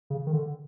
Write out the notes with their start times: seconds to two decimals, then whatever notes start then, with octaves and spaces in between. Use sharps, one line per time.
0.10 C#3
0.27 D#3
0.33 D3